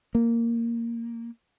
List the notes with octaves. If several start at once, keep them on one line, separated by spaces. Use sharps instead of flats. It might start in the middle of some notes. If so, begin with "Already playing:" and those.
A#3